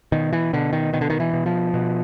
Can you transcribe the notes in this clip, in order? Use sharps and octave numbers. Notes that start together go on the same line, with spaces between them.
B2 D#3
E3
B2 D3
D#3
B2 D#3
D3
D#3
E3
B2
F3
B2